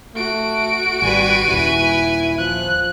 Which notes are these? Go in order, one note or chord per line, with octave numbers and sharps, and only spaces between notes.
A3 F#4 D7
G#1 G3 B4 G#5
D#1 C#3 E4
F3 F#6